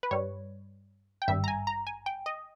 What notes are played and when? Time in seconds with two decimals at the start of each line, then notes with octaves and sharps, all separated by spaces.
0.03 B4
0.11 G2 G3 C#5
1.22 G5
1.28 G#1 G2 G3 E5
1.44 A#5
1.48 G#5
1.67 A#5
1.87 G#5
2.06 G5
2.26 D#5